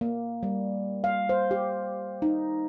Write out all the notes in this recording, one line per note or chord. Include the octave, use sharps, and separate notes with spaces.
A#3
G3
F5
C5
G4
D#4